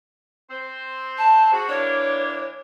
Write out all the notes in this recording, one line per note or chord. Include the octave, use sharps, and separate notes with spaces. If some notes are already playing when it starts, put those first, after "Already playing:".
C4 C5
A5
F#4 G#4
E3 A#3 D4 C#5